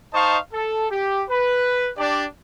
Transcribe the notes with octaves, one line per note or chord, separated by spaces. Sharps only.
D#4 C5 D#5 F5 A5 C#6
A4
G4
B4
D4 G4 D5